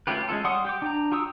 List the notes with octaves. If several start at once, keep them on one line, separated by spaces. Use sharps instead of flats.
A3 C#4 F4 G4 B4
G#3 C#4 F4 A4
G3 F#5 C6 C#6 D#6
G4 G5 D6
D4 A#5
F4 G4 C#6 D#6 E6